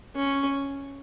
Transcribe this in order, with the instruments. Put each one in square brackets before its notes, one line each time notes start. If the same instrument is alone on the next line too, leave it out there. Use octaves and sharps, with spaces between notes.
[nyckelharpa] C#4